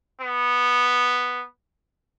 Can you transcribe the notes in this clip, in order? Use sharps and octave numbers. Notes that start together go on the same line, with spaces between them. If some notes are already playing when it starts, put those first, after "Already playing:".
B3